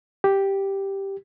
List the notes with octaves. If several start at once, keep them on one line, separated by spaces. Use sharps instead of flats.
G4